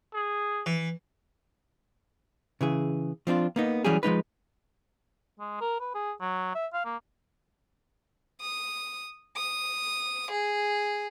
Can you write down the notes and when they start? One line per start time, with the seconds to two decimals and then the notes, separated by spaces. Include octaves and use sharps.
0.14 G#4
0.66 E3
2.61 C#3 E3 G#4
3.27 F3 C4 D4 F4
3.56 A#3 B3 D#4
3.85 E3 F#3 G3 C#4 G4 G#4
4.03 F3 G#3 D#4 B4
5.40 G#3
5.61 A#4
5.80 B4
5.94 G#4
6.21 F#3
6.55 E5
6.73 F5
6.85 A#3
8.41 D#6
9.37 D#6
10.32 G#4